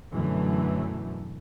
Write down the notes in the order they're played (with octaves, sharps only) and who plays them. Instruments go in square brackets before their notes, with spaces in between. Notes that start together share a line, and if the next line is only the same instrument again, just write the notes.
[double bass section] F#2 B2 D3 E3 F#3 A3